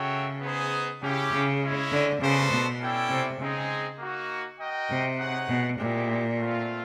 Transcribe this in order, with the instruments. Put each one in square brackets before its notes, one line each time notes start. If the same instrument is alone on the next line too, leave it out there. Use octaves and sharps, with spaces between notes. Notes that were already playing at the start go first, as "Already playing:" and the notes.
Already playing: [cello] C#3 [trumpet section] F#4 A4 C#5 E5 G5
[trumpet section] B3 D#4 G#4 C5
[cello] C#3 [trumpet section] C#4 E4 G4
[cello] C#3
[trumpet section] G#3 C#4 E4
[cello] D3
[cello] C#3 [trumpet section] B3 D4 F#4 A4 C5
[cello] B2
[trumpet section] C#4 E4 A4 D5 G5
[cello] C3
[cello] C#3 [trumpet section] G#3 C4 D#4 G#4
[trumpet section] A#3 D#4 F#4
F#4 A#4 D#5 G5
[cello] C3
[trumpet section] D#4 G#4 C#5 F#5
[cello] B2
[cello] A#2 [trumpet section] G#3 C4 E4 G4
[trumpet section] A3 C4 F4